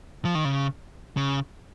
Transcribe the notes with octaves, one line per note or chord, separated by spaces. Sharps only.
F3
D#3
C#3
C#3